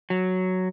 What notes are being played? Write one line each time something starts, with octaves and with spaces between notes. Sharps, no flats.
F#3